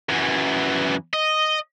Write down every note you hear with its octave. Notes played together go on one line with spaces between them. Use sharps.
F#2 E3
D#5